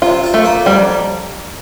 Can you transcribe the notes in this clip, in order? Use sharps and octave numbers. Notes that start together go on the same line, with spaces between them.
C3 F4
F4
A3
A#3
F2 G3